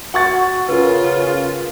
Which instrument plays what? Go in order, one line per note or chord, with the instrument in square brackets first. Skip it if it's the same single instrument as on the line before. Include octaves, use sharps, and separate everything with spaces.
[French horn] F#4 [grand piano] F#5 C#6 A6
[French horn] C#3 [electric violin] F4 [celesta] A#4 B4